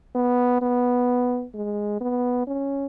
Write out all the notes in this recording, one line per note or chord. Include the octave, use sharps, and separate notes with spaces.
B3
B3
G#3
B3
C#4